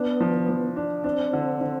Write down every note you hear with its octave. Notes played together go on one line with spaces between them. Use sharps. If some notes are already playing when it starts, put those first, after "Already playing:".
Already playing: B3 D4
F3
F3
D4
C4 D4
D3
D3